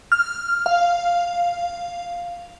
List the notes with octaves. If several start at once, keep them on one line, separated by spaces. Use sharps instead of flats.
F6
F5